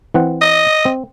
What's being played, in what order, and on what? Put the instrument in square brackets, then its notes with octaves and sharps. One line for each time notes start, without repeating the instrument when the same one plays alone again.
[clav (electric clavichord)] E3 C4 F#5
[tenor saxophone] D#5
[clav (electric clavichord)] C4